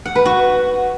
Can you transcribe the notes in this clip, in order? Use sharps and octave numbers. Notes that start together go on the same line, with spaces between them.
F#5
B4
F#4